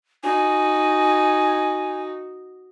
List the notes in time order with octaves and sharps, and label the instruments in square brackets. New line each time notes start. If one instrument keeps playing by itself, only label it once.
[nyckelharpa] D#4 F#4 [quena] G#5